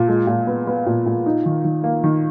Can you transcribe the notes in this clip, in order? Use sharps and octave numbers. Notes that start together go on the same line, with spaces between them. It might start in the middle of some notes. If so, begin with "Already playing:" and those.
Already playing: A#2
G#3
A#2
B3
B3
A#2
A#2
D#4
D#3
D#3
A#3
D#3